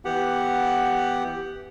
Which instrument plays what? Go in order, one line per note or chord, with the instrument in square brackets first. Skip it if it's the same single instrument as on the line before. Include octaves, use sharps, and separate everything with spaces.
[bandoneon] E3 B3 G4 F#5